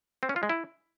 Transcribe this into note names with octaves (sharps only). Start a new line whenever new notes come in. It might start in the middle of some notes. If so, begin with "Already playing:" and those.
C4
C#4
F4
G#3
E4